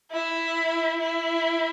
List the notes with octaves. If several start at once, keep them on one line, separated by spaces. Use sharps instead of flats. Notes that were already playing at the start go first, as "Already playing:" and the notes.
E4
E4